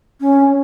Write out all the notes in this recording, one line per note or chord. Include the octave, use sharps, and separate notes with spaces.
C#4